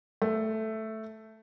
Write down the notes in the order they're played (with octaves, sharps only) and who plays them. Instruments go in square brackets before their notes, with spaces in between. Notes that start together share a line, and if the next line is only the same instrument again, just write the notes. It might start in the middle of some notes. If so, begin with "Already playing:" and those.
[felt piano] A3